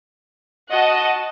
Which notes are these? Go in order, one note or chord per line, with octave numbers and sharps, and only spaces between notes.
F#4 D#5 F#5 A5